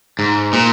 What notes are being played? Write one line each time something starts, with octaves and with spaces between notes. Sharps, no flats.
G#2
A#2